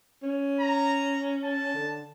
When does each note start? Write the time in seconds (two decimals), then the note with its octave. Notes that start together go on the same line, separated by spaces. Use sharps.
0.23 C#4
0.60 A#5
1.44 A5
1.75 D3